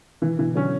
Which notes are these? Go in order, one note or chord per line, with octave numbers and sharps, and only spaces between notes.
B2 E3
B2 D3 E3
D3 F#3 C#4